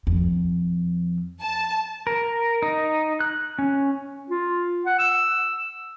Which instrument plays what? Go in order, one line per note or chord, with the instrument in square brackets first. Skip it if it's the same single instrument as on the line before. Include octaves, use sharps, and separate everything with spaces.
[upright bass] F2
[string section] A5
[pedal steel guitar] A#4
D#4
F#6
C#4
[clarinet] F4
F#5
E6